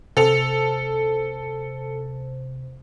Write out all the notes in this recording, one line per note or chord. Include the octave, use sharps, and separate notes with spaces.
C3 A4 C5 F7